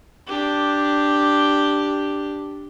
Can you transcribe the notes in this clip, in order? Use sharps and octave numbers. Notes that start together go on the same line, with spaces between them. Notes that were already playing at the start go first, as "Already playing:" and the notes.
D4 G4